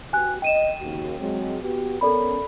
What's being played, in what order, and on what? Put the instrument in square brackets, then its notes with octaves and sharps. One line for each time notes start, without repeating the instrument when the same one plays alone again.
[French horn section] B3 F#4 G4 [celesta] G#5 F#6
[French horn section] D#5 [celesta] G5 D#7 E7
[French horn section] D#2 C#3 F#4
F#3 G#3 C4
B3 F#4 G4
[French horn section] B3 C#4 A#4 [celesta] A4 D5 B5